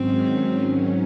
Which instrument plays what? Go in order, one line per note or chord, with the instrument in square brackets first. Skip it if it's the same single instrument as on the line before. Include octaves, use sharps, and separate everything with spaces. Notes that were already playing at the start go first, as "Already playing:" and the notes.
Already playing: [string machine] G#2 D#3 F#3 C#4 [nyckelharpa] C4